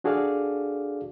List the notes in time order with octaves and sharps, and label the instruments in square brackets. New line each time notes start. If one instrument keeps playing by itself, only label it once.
[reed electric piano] D4 F#4 G#4 A4 D5 F5